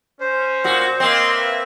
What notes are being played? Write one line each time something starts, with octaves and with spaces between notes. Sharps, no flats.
C#4 C5
A#2 F#4
A#3 C4 C#5 D#5 C6
B4 E5